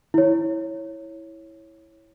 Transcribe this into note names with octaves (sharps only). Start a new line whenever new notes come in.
E4 C#5